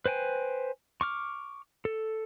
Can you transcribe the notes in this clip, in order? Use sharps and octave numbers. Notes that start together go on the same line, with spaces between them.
B4 C5 G5 G#5
C#6 D6 F6
A4